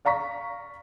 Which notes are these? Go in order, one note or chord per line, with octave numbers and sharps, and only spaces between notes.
D5 F5 A#5 C#6 B6